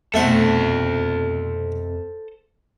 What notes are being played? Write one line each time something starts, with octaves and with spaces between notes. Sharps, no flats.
B1 F2 C3 A3 A4 C5 E5 F#5